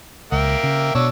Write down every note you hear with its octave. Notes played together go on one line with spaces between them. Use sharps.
C#2 A#3 E5 G5
C#3
B2 D4 C#5 E6